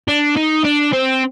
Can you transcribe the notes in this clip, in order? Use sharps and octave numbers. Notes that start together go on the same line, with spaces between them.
D4
D#4
D4
C4